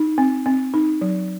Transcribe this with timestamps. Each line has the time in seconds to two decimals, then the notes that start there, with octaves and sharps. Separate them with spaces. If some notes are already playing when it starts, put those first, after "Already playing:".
Already playing: D#4
0.18 C4
0.46 C4
0.74 D#4
1.01 F#3